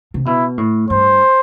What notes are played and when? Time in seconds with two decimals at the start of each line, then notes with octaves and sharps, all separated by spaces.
0.14 C3
0.26 B2 E4
0.58 A2
0.90 G2 C5